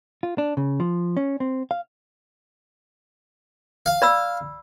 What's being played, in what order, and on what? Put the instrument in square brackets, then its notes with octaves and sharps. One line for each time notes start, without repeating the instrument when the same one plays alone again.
[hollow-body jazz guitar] F4
D4
C#3
F3
C#4
C4
F5
[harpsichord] F5
[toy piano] D5 B5 E6